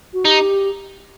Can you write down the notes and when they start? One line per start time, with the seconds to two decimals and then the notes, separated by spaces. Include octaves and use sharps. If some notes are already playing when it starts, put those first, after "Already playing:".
0.14 F#4
0.25 D#4 G4